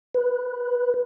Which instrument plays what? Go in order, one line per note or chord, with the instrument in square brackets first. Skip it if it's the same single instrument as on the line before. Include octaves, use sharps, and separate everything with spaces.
[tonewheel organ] B4